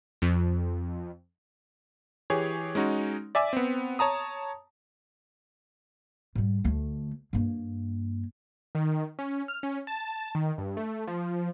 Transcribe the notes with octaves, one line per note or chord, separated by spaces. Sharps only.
F2
E3 G4 G#4 C#5
G#3 C#4 D#4 F#4
D5 E5 G#5 D6 B6
B3 C4
C#5 A5 A#5 D#6
G#2 G3
D2 A3
G2 A#3
D#3
C#4
F6
C#4
A5
D#3
G2
A3
F3